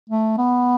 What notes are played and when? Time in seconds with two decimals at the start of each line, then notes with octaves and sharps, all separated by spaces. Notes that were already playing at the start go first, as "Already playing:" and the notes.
0.10 A3
0.38 B3